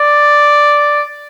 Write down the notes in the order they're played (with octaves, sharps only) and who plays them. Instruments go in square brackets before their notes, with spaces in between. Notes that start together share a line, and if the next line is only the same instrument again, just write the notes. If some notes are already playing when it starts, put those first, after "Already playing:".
Already playing: [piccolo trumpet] D5